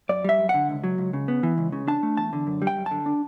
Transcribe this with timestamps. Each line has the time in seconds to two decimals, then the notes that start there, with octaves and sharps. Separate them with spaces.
0.09 F#2 D5
0.24 G3 E5
0.39 F#2
0.49 D3 F#5
0.69 C#2
0.84 F#3
0.98 C#2
1.13 C#3
1.28 B3
1.43 E3
1.58 C#2
1.72 C#3
1.88 D4 A5
2.03 A3
2.17 E2 A5
2.33 D3
2.47 F#2
2.62 G3
2.67 G5
2.77 F#2
2.86 D3 A5
3.06 D4